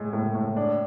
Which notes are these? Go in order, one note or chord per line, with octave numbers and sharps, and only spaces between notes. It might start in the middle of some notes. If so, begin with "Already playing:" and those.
Already playing: A2 G#3
A2
A2
D4